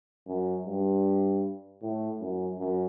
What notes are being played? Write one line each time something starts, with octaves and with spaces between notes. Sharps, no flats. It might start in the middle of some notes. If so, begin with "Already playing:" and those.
F#2
G2
A2
F#2
F#2